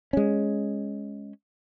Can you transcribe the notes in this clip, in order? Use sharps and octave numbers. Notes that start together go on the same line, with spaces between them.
G#3 C#4